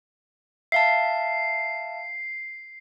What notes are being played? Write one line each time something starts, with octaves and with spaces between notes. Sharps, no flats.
E5 F5 A5 C7